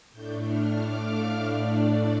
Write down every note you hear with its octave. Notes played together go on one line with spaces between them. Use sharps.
A2 A3 D4 G6
F6
D6
F5
A2 A3 D4 D5
D5